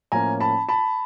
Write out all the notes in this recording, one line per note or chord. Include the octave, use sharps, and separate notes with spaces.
A2 F3 A#3 C#4 G#5 A#5
A5 B5
A5 B5